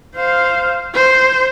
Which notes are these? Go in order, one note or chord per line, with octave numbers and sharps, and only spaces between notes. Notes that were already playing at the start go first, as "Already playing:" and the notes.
C5 F5
C5